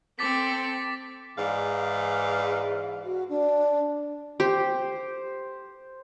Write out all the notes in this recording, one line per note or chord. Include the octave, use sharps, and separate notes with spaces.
C4 A4 G5 D6 A6 B6
G#2 E3 D5 F5
F#4
D4
G4 C5